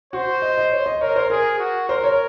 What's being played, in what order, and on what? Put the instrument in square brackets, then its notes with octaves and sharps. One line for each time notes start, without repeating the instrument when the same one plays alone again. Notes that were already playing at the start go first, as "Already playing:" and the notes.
[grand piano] F#4 [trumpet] C5
[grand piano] D#5
D#5
C#5
D#5
[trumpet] A#4 [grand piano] C#5
[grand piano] C5
[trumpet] G#4 [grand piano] A#4
[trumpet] F#4
[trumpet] A#4 [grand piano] C5
[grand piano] C#5